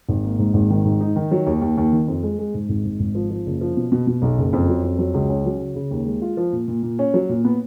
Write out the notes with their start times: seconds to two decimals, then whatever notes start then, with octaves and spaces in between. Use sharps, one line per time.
0.09 G#1
0.24 A#3
0.39 G#2
0.54 G#1
0.70 D#3
0.85 G#2
1.01 D#4
1.16 D#3
1.31 F#3
1.46 D#2
1.61 D#2
1.77 D#2
1.92 D#3
2.08 F2
2.23 G#3
2.39 G#3
2.54 G#2
2.69 G#1
2.85 G#2
3.00 G#1
3.15 F3
3.30 F3
3.46 F#1
3.61 F3
3.77 B2
3.92 B2
4.07 B2
4.22 B1
4.38 F#1
4.53 F2
4.69 F#3
4.84 F2
4.99 F#3
5.14 C#2
5.29 C#4
5.45 F#3
5.61 C#3
5.75 C#3
5.91 D#2
6.06 G#3
6.22 F4
6.37 F3
6.53 A#2
6.68 A#2
6.83 A#2
6.99 C#4
7.14 F#3
7.29 A#2
7.45 B3